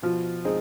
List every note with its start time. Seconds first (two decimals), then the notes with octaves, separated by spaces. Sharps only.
0.02 B2 F3
0.45 G#3 C4 D#4 G#4